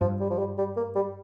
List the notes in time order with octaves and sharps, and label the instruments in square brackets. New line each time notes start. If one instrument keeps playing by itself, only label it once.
[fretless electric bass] G2 [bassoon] F3
[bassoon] G3
F3
G3
G3
A#3
G3